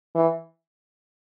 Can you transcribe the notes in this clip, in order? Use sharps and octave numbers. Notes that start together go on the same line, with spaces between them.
E3